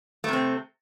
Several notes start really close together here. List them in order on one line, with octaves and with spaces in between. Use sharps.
A3 C3 C4